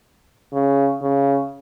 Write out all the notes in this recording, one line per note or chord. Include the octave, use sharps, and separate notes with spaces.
C#3
C#3